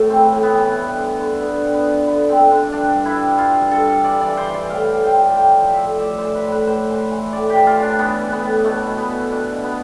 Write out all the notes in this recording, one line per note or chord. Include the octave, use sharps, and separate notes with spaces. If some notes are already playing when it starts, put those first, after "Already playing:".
Already playing: A2 A3
E3 C4
A2
B3
E3
G2
D3
D3
D3 B3
G2
B3
F3
D3 B3
D3 C4
D3 D4
G2 D4
G2
E4
G2
G2 F4
G2
A4
G2
E3 D5
D5
E3
C5
E3
D5
A2 F5
A2
G5
F3
F3 G5
F3
E5
A2
A2 D5 E5
C5
E3
B4
A2
B4
A2 C5
E3
E3
A2 D5
G4
A2
F4
E3 D4
E3 B3
E3
B3
A2
B2 A3
B2
B3
B2
B2 D4
B2
B3